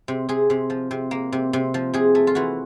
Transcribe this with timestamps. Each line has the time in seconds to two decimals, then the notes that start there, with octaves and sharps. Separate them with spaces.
0.08 C3
0.29 C3 G#4
0.50 C3
0.70 F3
0.91 C3
1.11 A#3
1.32 C3
1.53 C3
1.74 F3
1.94 C3 G#4
2.15 A3
2.27 F4
2.35 E3 F#4